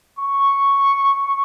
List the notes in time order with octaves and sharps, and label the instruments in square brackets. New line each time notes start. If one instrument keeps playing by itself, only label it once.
[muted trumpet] C#6